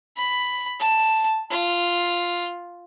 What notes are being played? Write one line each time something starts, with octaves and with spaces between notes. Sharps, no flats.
B5
A5
F4